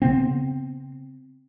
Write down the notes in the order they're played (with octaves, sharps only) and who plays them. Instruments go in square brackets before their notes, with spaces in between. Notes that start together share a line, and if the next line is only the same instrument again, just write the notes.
[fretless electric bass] C#3 B3 C4